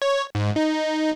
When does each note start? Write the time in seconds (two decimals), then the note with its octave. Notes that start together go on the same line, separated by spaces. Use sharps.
0.02 C#5
0.35 G#2
0.56 D#4